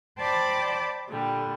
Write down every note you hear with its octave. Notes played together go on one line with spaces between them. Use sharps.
C5 D5 G5 A5 B5 D6
A#2 D3 G3